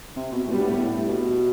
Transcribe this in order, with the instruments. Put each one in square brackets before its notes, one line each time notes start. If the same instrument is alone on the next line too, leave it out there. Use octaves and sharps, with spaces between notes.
[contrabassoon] C3
B2
[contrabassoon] A2 [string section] G3 B3
[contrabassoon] G2
A2
A2
B2